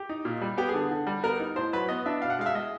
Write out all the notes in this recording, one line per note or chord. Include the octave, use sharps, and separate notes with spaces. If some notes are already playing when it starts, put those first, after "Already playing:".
Already playing: G4
D#4
A#2
G3
B3 G4
G#4
D3
D3
G3
B3 A#4
D#4
A2 C5
F#3 B4
B3 D#5
D4 E5
B2 F5
F#5
G#3 F5
E5
G#3 D#5